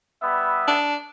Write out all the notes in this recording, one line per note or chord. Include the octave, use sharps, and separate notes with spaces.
G3 B3 E5
D4